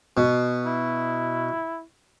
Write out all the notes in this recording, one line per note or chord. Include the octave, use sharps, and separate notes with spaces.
B2
E4